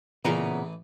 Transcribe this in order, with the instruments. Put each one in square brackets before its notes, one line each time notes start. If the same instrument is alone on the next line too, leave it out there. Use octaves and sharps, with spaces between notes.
[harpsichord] A1 E3 [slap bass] A#2 [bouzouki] C#3 B3 A#5